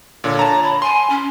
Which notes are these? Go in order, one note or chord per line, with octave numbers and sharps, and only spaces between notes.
A#2 D3 C#5
A5 A#5
B5
G#5 C6
C#4